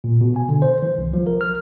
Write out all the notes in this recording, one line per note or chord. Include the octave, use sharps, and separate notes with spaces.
A#2
B2
G#5
D3
C5
E3
C2
F3
A#4
F6